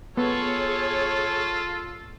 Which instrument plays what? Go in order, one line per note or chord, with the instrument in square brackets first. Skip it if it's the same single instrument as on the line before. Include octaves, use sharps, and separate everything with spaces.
[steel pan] B3 [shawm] F4 [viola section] G#4 C#5 [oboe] A4